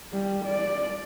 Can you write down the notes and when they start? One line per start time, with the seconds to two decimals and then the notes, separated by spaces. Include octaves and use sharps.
0.12 G3
0.46 D5